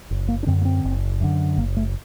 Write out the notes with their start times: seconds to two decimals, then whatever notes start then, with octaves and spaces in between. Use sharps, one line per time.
0.11 F#1
0.28 A#3
0.43 D4
0.46 F#2 D3 C4
0.61 A#3
0.65 C4
0.84 F#1
1.21 F#2 D3
1.58 F#1 A#3
1.77 A3